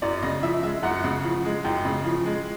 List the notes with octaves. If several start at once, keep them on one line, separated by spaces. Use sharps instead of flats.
F#2 D5
C#3 D#5
F3 E5
G#3 E5
F#2 F#5
C#3
F3
G#3
F#2 G5
C#3
F3
G#3